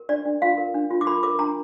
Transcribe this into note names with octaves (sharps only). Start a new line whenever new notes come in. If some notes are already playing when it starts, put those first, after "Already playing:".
Already playing: A#4
D4 D5
D4
F4 F5
A#4
D4
F4
D6
A#4 B5
A#4 D6
D4 A#5